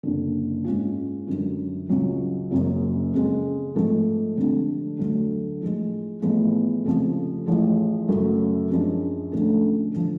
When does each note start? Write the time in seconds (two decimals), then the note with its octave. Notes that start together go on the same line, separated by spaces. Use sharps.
0.03 F#1 F#2 D3
0.64 G#2 G#3 C#4 F4
1.27 F#2 D3 F#3
1.89 C#2 C#3 F#3 C#4
2.51 F#1 F#2 C#3 F#3
3.13 F2 C#3 G#3
3.75 G#2 F3 A3
4.36 F1 F2 D3
4.99 D2 D3 F#3
5.61 A2 F3 G#3
6.22 A1 A2 F3 G#3 B3
6.84 F1 F2 C#3 F3
7.46 A1 A2 F3 G#3
8.08 F#2 C#3 F#3 A3
8.70 F#2 F3 G#3 D4
9.32 D2 D3 F3 A3 C#4
9.95 D3 F3